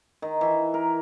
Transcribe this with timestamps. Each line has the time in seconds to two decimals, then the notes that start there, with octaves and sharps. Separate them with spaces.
0.22 D#3
0.41 E3
0.74 A#4